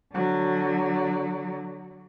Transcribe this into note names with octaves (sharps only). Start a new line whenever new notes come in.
D3 F#3